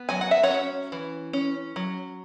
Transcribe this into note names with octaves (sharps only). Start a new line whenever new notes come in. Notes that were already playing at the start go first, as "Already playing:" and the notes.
Already playing: B3
F#3 G#5
F#5
E5
C#5 F#5
C#4
E3
C#4
F#3